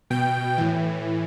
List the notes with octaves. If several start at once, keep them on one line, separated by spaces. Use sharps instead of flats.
B2 G5
A2 E3